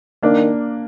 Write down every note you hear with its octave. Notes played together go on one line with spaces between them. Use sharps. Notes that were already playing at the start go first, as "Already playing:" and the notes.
D#3 A#3 D4